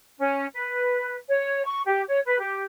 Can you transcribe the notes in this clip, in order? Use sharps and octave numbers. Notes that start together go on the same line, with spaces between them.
C#4
B4
C#5
C#6
G4
C#5
B4
G4